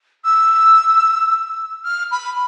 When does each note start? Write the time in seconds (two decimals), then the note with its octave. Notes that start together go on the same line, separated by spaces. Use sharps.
0.25 E6
1.85 F6
2.11 B5